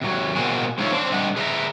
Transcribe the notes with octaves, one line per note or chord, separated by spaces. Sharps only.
C3 F#3
B2 A#3 C4 F#4 G#4
G#3 C4 D#4 F4 C#5 E5
C4 D4 C5
C3 G3 D4 D#5 F#5
G#4 B4 D5 E5 A#5